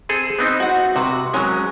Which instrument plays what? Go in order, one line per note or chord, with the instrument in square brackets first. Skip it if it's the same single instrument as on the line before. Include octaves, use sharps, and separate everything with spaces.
[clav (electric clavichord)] C4 G#4 A4
B3 C4 D#4
[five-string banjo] F#4 F#5
[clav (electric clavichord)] C3 [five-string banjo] F#4 B4
[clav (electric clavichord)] F#3 G#3 [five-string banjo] C#4 A#4